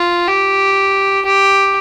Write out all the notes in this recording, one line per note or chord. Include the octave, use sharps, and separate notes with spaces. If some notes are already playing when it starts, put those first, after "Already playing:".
Already playing: F4
G4
G4